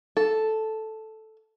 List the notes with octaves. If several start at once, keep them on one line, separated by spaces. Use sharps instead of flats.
A4